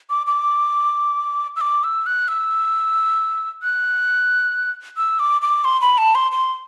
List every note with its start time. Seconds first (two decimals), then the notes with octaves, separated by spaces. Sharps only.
0.10 D6
0.27 D6
1.56 E6
1.61 D6
1.84 E6
2.06 F#6
2.28 E6
3.63 F#6
4.97 E6
5.19 D6
5.42 D6
5.65 C6
5.81 B5
5.98 A5
6.15 C6
6.32 C6